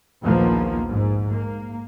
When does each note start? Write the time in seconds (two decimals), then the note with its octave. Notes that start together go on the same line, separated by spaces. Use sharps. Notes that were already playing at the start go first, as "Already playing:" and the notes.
0.21 A#1 D#2 F3 A#3 B3
0.87 G#2
1.30 A#3